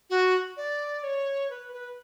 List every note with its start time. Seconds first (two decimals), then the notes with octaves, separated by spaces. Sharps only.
0.10 F#4
0.57 D5
1.04 C#5
1.50 B4
1.73 B4